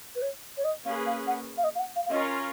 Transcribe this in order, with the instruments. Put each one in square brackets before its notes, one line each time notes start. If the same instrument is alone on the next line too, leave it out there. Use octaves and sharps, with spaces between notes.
[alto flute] B4
C#5
C#5
D#5
[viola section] A#3 C#4 G#4 B4 [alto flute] F5
[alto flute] F5
F#5
F5
D#5
F5
F#5
F5
F5
[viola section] C#4 F4 A#4 C#5 [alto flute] D#5